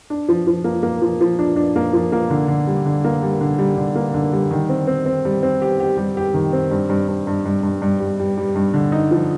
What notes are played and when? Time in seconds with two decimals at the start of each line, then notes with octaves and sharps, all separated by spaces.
0.10 D4
0.29 F3
0.47 F3
0.64 A#3
0.83 A#3
1.02 F3
1.21 F3
1.39 D4
1.56 D4
1.76 A#3
1.93 F3
2.12 A#3
2.30 D3
2.48 D3
2.67 G3
2.86 D3
3.04 A#3
3.23 G3
3.41 D3
3.58 G3
3.77 D3
3.95 A#3
4.14 D3
4.33 G3
4.51 D#3
4.69 C4
4.87 C4
5.06 C4
5.25 G3
5.43 C4
5.62 G4
5.80 G4
5.98 G3
6.17 G4
6.34 D#3
6.53 C4
6.71 G2
6.90 G2
7.08 G2
7.27 G2
7.45 G2
7.63 G2
7.82 G2
8.00 G3
8.19 G3
8.37 G3
8.56 G2
8.74 D3
8.92 D#4
9.11 F3